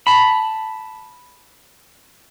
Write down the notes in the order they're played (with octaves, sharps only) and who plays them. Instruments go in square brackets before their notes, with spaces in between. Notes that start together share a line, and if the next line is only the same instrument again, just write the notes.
[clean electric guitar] A5 B5